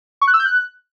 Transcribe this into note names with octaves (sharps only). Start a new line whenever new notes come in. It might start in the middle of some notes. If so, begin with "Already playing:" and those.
C#6
F#6
E6
G6
F#6